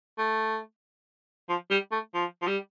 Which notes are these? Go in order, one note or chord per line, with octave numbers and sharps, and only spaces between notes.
A3
F3
G3
A3
F3
F3
G3